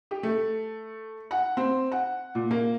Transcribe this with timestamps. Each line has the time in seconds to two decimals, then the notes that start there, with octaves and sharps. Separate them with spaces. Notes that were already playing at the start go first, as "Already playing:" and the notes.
0.11 G4
0.23 A3
1.31 F#5
1.57 C4
1.92 F#5
2.35 A#2
2.51 A#3